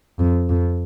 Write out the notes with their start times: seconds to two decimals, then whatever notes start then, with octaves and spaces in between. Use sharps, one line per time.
0.19 F2
0.49 F2